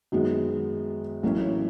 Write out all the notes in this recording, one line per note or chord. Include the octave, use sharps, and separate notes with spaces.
F#2 D#3 G#3 B3
A1 A2 F#3 A#3 C#4